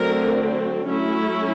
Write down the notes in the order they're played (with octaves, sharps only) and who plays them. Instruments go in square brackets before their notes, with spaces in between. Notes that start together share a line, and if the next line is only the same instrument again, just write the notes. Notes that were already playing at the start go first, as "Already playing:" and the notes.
Already playing: [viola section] D3 F#3 A3 C4 A#4
F#3 A3 C#4 E4